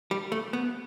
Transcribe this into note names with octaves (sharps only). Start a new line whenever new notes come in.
G3
A3
B3